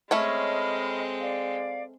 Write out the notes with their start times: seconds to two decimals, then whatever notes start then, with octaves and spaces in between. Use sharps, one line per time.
0.11 G#3 A3 C4 C#4 C#5 D#5 B5 F6
1.21 D5 F5